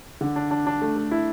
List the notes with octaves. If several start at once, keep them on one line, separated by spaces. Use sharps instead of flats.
D3
D4
D4
D4
A3
A3
E4